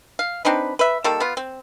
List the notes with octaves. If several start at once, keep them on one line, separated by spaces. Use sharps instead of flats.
F5
C4 D4 D#4 B4
B4 E5
D#3 G3 A#3 A4
B3 F4
C4